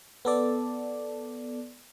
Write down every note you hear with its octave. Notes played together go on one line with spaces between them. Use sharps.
B3 A4 D5